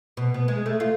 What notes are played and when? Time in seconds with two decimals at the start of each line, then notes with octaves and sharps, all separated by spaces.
0.17 B2
0.34 B3
0.48 G#3
0.66 A3
0.80 F4